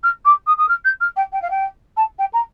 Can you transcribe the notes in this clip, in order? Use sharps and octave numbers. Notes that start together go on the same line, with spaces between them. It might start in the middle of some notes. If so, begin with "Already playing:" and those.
F6
D6
D#6
D#6
F6
G6
F6
G5
G5
F5
G5
A5
G5
A#5